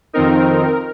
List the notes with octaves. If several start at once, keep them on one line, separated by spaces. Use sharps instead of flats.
F2 D#3 C4 D#4 A#4